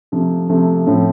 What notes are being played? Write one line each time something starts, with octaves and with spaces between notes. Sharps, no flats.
C3 F3 A3
C3 F3 A3
A2 F3 C4